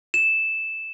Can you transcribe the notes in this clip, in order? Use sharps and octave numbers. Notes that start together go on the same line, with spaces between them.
E7